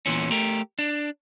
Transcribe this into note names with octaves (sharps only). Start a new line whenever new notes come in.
E2 A#2 E3 C#4
A3 G4 A#4
D4